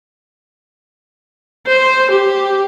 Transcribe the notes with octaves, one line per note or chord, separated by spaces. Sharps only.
C5
G4